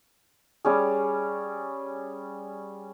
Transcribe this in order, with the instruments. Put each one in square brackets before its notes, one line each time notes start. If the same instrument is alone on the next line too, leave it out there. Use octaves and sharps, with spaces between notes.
[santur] G3 C#4 G#4